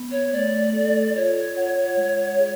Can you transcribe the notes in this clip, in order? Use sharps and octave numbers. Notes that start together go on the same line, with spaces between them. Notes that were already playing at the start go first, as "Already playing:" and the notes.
Already playing: B3
C#5
A3 D5
A4
F4 C#5
F#5
G#3
G#4